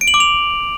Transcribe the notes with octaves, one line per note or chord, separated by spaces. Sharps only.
D7
F#7
D6
F7